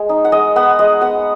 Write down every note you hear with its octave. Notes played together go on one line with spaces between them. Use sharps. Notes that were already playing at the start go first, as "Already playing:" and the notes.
Already playing: G#3
D#4
F#5
G#3 D#5
B3 F#5
G#3 D#5
B3 F#5